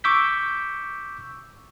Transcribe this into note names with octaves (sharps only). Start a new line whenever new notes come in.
C#6 D6 E6 G6 B6